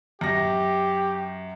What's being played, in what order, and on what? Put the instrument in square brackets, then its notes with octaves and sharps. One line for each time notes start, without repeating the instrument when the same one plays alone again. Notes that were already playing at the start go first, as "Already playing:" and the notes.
[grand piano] F#2 A#6 [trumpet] G4